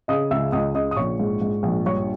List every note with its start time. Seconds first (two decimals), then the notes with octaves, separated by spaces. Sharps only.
0.08 C#3 D#5 D#6
0.31 C#2 E5 E6
0.52 C#2 D#5 D#6
0.74 C#3 D#5 D#6
0.91 D#6
0.96 A#1 C#5 C#6
1.19 G#2
1.42 G#2
1.63 A#1
1.85 G2 C#5 C#6